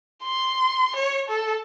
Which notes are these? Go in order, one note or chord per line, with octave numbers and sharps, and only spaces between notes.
C6
C#5
A4